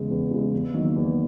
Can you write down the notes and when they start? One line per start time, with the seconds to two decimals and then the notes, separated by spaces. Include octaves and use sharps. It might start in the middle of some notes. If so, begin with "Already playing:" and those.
Already playing: E2 C#3 G#3
0.10 E2
0.31 C#3 G#3
0.53 E2
0.74 D#3 F#3 A#3
0.96 E2